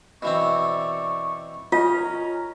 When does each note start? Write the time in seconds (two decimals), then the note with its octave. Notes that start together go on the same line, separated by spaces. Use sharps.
0.22 B2 E3 C4 D5 C#6
1.72 C#4 F4 A#4 D#5 A#5